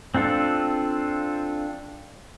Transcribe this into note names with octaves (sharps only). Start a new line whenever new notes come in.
C4 D4 F4 A4